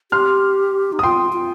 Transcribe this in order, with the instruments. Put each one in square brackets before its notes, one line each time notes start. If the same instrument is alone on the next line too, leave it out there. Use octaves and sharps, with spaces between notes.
[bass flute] G4 [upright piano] C6 F6
[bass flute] D#4
[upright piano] D#6
[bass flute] F4 [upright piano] G5 C6
[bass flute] F4